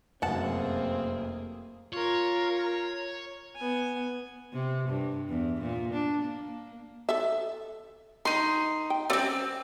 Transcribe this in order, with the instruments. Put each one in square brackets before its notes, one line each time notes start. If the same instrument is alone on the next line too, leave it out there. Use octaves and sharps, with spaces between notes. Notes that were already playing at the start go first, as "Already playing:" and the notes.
[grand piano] F1 F#2 [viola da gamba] A#3 G#4 [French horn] C4 [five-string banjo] F#5 A5
[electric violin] F4 A#4 [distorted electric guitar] C#5
[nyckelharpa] B3 G#5
[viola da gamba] C3
G2
E2
A#2
D4
A#3
[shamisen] A4 E5
[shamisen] D#3 [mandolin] D#4 C6
[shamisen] G5
[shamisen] G3 C#4 C#5 [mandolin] A3 C4